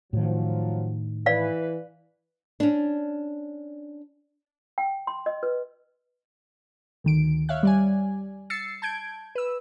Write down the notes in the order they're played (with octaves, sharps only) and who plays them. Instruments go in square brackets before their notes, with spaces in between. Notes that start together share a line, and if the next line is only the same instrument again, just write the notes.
[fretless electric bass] A2 D#3 [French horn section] F3 F#3
[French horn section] E3 B4 [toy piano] D5 F5
[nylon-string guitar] C#4 D4
[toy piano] G5
C6
D#5
B4
[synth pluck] D2 D#3 D7
C#5 E5 F5 F#6
G3 D5 G#5
E6 A6 C7 C#7
A5 G6 G#6 D7
B4 E6